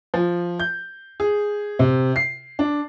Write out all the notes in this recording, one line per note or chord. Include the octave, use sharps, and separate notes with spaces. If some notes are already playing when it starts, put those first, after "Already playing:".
F3
G6
G#4
C3
C7
D4